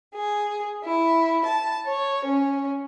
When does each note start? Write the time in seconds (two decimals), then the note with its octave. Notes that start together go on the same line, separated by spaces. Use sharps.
0.14 G#4
0.84 E4
1.45 A5
1.87 C#5
2.25 C#4